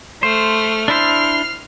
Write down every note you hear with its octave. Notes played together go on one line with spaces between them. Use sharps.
A3 C5 F6
D4 E4 C5 F6 C7